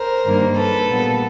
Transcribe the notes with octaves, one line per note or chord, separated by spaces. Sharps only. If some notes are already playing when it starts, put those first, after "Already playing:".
Already playing: A#4 C5
G2 D#3 G3 A#3
A4 B4
A#2 G3 B3